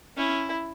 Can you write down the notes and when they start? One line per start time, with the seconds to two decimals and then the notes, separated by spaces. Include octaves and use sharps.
0.17 C#4 E4